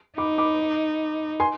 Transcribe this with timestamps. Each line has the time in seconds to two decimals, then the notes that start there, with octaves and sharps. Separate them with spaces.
0.18 D#4 B5 D6
0.38 B5 D6
1.40 G#5 C6